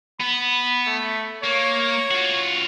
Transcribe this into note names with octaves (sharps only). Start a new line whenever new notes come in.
B3 B5
A3
A#3 C#5
F4 F#4